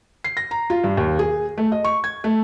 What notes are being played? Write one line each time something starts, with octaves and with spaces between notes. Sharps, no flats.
C7
A#6
A#5
F4
G2
D#2
G#4
A3
D#5
C#6
G#6
A3